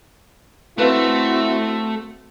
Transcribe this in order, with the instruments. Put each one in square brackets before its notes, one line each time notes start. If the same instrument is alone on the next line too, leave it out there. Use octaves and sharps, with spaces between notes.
[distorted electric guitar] A3 [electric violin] C4 F#4 [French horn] E4 [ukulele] A4 B4 F5